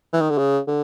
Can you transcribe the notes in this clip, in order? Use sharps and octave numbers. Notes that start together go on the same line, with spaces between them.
E3
D#3
D3
C#3
D3